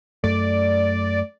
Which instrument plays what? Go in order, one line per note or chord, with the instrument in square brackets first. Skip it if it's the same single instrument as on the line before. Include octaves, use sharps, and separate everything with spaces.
[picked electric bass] F#2 A3 [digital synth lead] D5